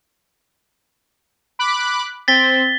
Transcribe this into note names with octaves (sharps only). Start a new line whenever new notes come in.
B5 D6 F#6
C4 A6 B6 G7